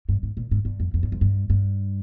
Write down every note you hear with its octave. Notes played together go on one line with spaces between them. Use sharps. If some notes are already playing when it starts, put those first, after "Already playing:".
G2
G#2
A#2
G#2
G2
F2
F2
G2
F2
G2
G2